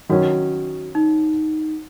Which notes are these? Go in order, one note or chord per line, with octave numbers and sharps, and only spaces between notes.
D#3 F#3 C#4 F#4
D#4